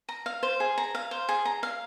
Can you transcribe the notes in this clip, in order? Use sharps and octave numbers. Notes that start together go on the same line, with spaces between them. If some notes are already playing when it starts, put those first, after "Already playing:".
A#5
F5
C5
G#4
A#5
F5
C5
G#4
A#5
F5